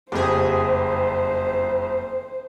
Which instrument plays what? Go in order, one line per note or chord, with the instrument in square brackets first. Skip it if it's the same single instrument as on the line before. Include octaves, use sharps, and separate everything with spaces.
[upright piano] F#1 F2 [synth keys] G4 G#4 [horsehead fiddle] C5